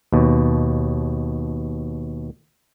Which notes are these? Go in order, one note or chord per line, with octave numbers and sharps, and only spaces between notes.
D#2 B2